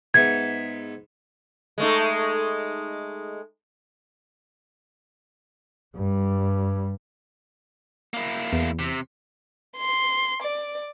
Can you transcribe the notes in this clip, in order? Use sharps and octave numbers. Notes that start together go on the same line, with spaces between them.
G#2 B3 E5 G#6
G#3 A3 D#4
G2 G3
A#3 E4
E2
C3
C6
D5